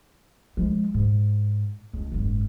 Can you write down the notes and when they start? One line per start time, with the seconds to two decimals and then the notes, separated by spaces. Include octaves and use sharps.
0.57 F3 G#3
0.94 G#2
1.93 C#2
2.12 F#1 G#2